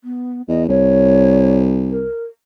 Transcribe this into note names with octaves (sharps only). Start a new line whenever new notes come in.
B3
E2 D#5
C2 C#5
A#4